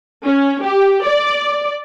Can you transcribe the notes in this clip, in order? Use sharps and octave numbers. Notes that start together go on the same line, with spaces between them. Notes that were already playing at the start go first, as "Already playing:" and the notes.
C#4
G4
D5